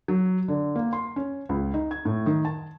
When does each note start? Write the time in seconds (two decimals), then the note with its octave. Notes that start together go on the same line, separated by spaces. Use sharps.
0.08 F#3
0.48 D3
0.76 A#3
0.93 C6
1.16 C#4
1.49 C#2
1.74 D#4
1.91 G#6
2.05 A2
2.26 D#3
2.45 A5